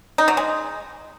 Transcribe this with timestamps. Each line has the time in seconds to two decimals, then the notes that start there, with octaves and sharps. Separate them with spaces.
0.18 D#4
0.28 F#3
0.37 G#3